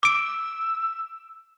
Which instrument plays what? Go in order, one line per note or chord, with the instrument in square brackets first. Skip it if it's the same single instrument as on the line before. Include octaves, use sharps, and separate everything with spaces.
[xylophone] D6 D7 [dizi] E6